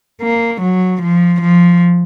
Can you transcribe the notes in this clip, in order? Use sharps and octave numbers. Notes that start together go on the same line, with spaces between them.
A#3
F#3
F3
F3